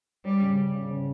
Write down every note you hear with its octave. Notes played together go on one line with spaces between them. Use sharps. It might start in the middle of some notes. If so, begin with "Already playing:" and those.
G3 C#4
C#3
C#4
C#3
C#3